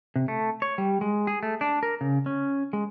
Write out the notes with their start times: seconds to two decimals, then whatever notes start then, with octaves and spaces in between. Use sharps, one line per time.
0.16 C3
0.28 A3
0.62 C#5
0.78 G3
1.01 G#3
1.27 G#4
1.43 A3
1.61 D4
1.83 A#4
2.01 C#3
2.26 C#4
2.73 G#3